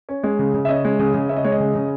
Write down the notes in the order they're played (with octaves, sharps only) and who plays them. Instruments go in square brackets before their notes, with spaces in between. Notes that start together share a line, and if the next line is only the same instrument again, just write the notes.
[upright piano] C#4
G#3
C#3
C#3
E5
C#4 D#5
G#3
C#3
C#3
C#4 E5
D#5
G#3 C#5
D#5
C#3
C#3